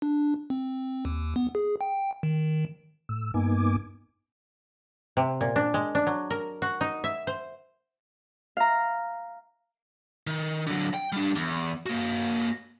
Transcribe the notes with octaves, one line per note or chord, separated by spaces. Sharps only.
D4
C4
D#2
B3
G#4
G5
D#3
A2 E6
G2 A#3 B3 D#4 G#5 D6
C3
A#2
D4
G#3
D4
F#3
A#4
F#4
D#4
E5
C5
F5 A#5
D#3
D3 F#3
G5
G3 D4
E2
A#3 F#4